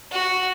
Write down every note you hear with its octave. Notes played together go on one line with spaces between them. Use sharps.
F#4